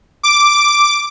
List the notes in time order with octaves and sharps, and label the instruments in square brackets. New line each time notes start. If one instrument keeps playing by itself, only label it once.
[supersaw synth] D6